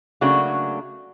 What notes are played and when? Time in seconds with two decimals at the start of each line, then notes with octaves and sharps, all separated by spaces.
0.21 C#3 F#3 A3 A#3 D4 F#4